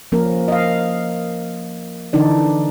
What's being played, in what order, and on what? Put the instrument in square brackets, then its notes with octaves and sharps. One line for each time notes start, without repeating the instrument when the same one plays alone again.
[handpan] F3 A#3 C#4 A#4
D#5 F5
D3 E3 D4 D#4 D5